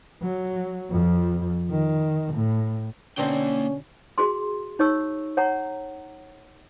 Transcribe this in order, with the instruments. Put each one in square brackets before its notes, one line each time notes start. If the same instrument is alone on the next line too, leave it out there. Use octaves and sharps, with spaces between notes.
[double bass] F#3
F2 F3
D#3
A2
[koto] B2 D3 C4 [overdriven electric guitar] A#3 G5 [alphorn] C#4
[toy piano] F#4 G#4 C6
D#4 C#5 C#6 E6
C#5 F#5 A#5